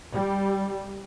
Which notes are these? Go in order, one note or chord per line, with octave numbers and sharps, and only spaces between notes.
G3